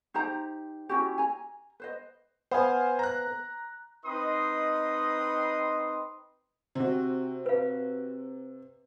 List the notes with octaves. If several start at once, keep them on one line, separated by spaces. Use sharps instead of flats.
D#4 G4 C5 A#5
C#4 E4 F#4 G4
G#5 A#5
B4 C5 D#5
B3 C5 F5 G#5
A#5 F#6
C4 D#4 B4 D#5 C6 D#6
C3 C4 F#4
B4 F5